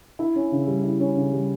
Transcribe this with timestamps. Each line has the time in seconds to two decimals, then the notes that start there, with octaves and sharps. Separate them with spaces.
0.19 E4
0.36 C#4
0.52 C#3
0.67 G3
0.83 E4
1.00 C#4
1.16 C#3
1.33 G3